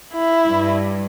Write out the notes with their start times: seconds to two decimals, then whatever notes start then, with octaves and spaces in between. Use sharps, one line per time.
0.14 E4
0.47 G2